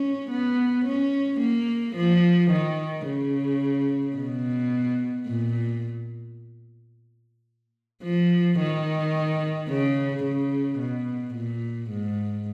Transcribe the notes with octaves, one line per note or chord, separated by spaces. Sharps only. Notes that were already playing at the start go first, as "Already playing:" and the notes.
Already playing: C#4
B3
C#4
A#3
F3
D#3
C#3
B2
A#2
F3
D#3
C#3
C#3
B2
A#2
G#2